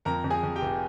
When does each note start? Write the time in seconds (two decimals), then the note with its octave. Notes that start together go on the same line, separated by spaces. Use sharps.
0.05 F2 A#4 A#5
0.24 F2
0.30 G#4 G#5
0.43 F2
0.56 G4 G5
0.61 F1